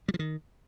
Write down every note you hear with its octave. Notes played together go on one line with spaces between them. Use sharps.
G3
F3
D#3